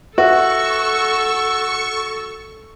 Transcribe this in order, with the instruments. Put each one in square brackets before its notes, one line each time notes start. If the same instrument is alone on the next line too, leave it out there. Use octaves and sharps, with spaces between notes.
[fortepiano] F#4 [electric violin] A4 E6 [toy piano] B4 E5 [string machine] C#6